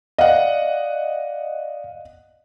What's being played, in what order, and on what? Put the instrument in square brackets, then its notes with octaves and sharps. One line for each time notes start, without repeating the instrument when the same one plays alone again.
[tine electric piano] D5 F5 [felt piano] D#5 F#5